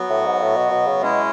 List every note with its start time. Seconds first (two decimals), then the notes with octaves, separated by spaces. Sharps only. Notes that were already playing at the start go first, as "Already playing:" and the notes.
Already playing: F#3 B3 F#4
0.10 A2
0.25 G#2
0.41 A2
0.56 B2
0.71 B2
0.86 C#3
1.02 B2 G#3 C#4 E4